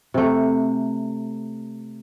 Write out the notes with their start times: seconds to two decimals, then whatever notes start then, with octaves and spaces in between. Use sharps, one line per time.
0.14 C3 A3